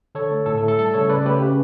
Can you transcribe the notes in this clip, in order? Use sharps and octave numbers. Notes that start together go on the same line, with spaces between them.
D3 A4 C#5
A3
A2 A4
A4
A3
A4
G3 A4
C#3 A4 C#5
C#3 B4 D5
A3 G4 B4
C#3